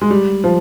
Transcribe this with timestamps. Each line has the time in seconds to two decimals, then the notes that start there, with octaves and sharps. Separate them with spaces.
0.01 G#3
0.10 G3
0.44 F3